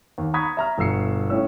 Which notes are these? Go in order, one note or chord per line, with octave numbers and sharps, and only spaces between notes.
D#2
A#5 B5 C#6 D#6 G#6 B6
E5 A#5 F6
G1 B2 F#5 E6 C7 C#7
A2 C#4 E6